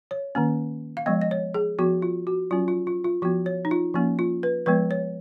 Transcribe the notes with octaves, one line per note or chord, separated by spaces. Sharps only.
C#5
D#3 A#3 C#4
F5
F3 G#3 B3 D#5
D#5
C#5
G#4
F3 B3 F#4
F4
F#4
F#3 C#4 F4
F4
F4
F4
F3 B3 F#4
C#5
D#4
F4
F3 A#3 C#4
F4
B4
F3 G#3 B3 B4
C#5